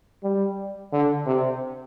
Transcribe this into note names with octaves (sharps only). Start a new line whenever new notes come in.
G3
D3
C3